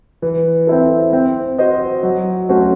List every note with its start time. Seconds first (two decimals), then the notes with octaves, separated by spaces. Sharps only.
0.22 E3
0.67 C4 E4 A4
1.13 C4
1.58 F#4 C5 D#5
2.03 F#3
2.49 A3 C#4 F#4 C5